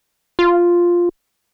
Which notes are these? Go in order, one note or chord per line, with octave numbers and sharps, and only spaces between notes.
F4